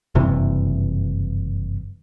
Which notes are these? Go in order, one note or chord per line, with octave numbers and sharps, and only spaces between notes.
F#1 G2 C3 E3